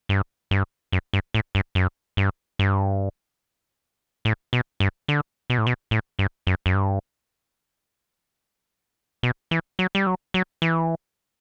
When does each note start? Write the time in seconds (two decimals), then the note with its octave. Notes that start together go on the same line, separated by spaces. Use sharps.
0.09 G2
0.51 G2
0.92 F#2
1.13 G2
1.34 A2
1.55 G2
1.75 F#2
2.17 G2
2.59 G2
4.25 A2
4.53 B2
4.80 G2
5.08 D3
5.50 B2
5.58 A2
5.67 B2
5.91 A2
6.19 G2
6.47 F#2
6.66 F#2
6.74 G2
9.23 B2
9.51 E3
9.79 F#3
9.95 G3
10.07 F#3
10.34 F#3
10.62 E3